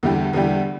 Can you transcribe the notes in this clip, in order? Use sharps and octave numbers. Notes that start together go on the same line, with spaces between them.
E2 D3 G3 E4 G4
E2 D3 G3 E4 G4